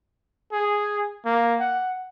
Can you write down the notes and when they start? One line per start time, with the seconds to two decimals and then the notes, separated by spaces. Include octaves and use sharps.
0.52 G#4
1.25 A#3
1.60 F#5